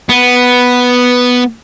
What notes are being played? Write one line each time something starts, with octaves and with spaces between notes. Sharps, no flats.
B3